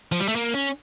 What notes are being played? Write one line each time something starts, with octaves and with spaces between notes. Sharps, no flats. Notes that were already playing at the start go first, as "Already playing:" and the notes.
F3
G3
A3
A#3
C#4